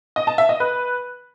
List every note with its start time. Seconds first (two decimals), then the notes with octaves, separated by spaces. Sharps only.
0.16 D#5
0.27 A5
0.38 E5
0.49 D#5
0.60 B4